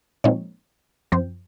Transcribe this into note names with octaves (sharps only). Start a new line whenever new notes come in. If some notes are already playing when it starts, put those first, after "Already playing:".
A#2 F3 G#3 C4 D#4 C#5
F#2 F3 C4 C5